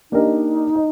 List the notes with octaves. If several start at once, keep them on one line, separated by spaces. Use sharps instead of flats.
A#3 D4 D#4 G4 A#4 D#5
D#5